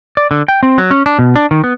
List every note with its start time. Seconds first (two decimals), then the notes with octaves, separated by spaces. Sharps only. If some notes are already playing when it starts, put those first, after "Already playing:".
0.17 D5
0.31 D3
0.48 G5
0.63 C4
0.78 F#3
0.91 C#4
1.06 D4
1.19 B2
1.36 D4
1.51 D#3
1.64 B3